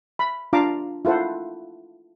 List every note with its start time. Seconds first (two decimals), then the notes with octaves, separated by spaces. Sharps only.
0.19 B5
0.53 D4 F4 F5 A5 A#5 D6
1.05 E4 F4 A4 C5 F#5